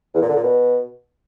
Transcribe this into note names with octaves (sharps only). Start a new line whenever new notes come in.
E2
A#2
D3
A#2
B2